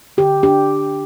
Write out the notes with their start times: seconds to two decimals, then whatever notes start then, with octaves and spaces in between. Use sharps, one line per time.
0.17 D3 G4
0.43 D4 G4